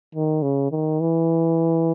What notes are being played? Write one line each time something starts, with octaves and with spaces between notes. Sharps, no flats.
D#3
C#3
D#3
E3